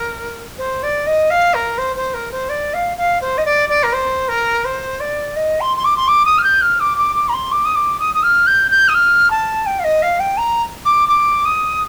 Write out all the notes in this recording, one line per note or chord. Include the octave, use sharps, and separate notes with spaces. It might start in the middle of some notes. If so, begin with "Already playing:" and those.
Already playing: A#4
C5
D5
D#5
F5
A#4
C5
C5
A#4
C5
D5
F5
F5
C5
D#5
D5
D5
A#4
C5
A#4
C5
D5
D#5
C6
C6
D6
C6
D6
D#6
F6
G6
F6
D6
D6
D6
A#5
C6
D6
D#6
D6
D#6
D#6
F6
G6
G6
D#6
F6
A5
G5
F5
D#5
F5
G5
A#5
D6
D6
D#6